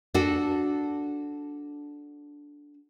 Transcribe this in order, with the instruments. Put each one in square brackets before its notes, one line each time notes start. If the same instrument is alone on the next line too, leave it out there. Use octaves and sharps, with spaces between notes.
[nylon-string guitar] D4 F#4 A4